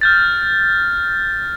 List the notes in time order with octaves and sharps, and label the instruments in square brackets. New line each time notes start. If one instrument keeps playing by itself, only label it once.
[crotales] F6 G6 A6